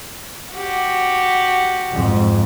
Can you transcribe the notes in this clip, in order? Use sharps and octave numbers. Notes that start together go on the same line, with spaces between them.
F#4 G4
F2 G#2